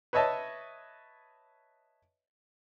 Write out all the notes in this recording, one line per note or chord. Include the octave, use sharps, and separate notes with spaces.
B4 C#5 D#5 E5 A5